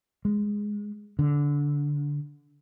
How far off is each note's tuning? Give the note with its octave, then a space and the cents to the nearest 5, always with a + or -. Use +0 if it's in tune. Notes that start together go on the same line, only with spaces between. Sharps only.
G#3 -5
D3 -15